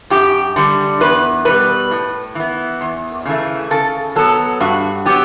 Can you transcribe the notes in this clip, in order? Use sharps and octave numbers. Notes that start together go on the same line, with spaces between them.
F#2 G4
D3 G3
E2 B4
B2 G3 B4
A2
E3 B3
E2
C#3 E3 A3
C#3 A4
F#3 B3 A4
G2 F#4
F#3 B3 G4